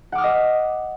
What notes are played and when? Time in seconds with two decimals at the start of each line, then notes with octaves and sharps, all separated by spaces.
0.12 F#5
0.15 D6
0.18 F6
0.21 D#6
0.24 D#5